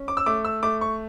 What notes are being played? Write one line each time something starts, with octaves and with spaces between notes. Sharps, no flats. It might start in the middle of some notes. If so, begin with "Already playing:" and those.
Already playing: C#4
D6
E6
A3 D6
E6
A3 D6
C#6